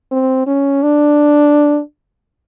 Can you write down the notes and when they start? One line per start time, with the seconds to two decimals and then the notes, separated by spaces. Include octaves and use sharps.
0.11 C4
0.47 C#4
0.83 D4